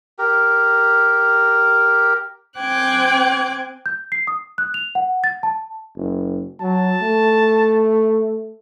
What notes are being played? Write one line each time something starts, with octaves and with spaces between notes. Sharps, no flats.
G4 A#4
C4 G5 G#5 D6 F#6 G#6
G6
C7
D#6
F#6
F7
F#5
A6
A5
F#1
F#3 A5
A3